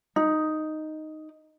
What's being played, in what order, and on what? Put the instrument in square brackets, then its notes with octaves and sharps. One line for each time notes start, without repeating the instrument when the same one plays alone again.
[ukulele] D#4